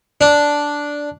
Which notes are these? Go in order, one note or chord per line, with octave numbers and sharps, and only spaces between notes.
D4